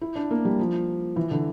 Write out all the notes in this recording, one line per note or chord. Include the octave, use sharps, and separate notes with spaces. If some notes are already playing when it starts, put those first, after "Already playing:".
E4
D4
A#3
G3
F3
E3
D3